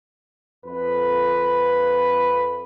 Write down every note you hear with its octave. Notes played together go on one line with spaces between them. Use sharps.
F2 B4